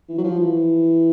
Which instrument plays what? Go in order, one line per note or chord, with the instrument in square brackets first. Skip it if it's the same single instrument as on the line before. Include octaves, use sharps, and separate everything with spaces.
[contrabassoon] E3
F#3
F3
E3